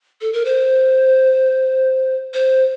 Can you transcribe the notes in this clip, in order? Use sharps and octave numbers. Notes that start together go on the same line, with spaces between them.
A4
A#4
C5
C5